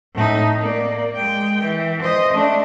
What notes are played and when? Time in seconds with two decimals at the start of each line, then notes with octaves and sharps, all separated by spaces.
0.14 A2 D#4
0.61 A#3 D5
1.16 G#3 G5
1.62 E3
2.02 C5 D#5
2.33 A3 D4